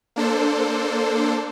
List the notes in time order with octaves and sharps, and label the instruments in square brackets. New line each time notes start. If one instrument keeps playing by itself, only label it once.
[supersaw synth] A#3 D4 A4 C5